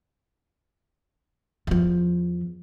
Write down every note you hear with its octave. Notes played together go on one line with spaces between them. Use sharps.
E2 F3